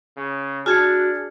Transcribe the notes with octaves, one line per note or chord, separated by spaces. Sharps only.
C#3
D4 F#4 G#4 A5 F6 G#6 C#7